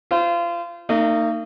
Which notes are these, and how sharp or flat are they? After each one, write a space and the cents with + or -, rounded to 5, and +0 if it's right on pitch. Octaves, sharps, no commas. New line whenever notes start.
F4 -25 C5 -25
A#3 -45 D#4 -15